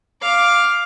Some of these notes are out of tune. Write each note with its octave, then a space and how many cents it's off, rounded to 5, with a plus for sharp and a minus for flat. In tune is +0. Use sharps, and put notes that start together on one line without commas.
F5 +5 D6 +0